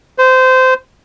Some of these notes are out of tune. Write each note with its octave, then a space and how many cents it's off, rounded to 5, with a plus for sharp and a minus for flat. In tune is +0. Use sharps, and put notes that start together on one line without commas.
C5 -20